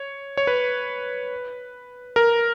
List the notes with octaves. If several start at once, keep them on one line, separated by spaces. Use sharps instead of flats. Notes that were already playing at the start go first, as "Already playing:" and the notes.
Already playing: C#5
C#5
B4
A#4